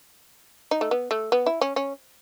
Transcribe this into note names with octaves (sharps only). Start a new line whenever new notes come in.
D#4
A3
B3
A3
B3
E4
C#4
C#4